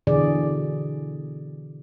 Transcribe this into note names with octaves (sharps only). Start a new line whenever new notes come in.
B2 D3 E3 G#4 D5